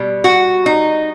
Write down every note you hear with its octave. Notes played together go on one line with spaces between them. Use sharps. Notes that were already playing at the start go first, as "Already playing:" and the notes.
Already playing: B2 G3
F#4
D#4